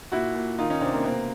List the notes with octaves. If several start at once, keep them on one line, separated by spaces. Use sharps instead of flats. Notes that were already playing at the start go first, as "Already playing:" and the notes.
A#2 E4 F#4
A#2
D#3 D#4 F4
C#4 D#4
C3 C4 D4
A#3 C4
B2 A#3 C4